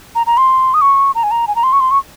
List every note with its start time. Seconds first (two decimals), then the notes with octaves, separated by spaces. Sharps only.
0.15 A#5
0.27 A#5
0.37 C6
0.74 D#6
0.81 C#6
1.15 A#5
1.23 G#5
1.31 A#5
1.48 G#5
1.56 A#5
1.63 C6
1.73 C#6
1.80 C6
1.91 C#6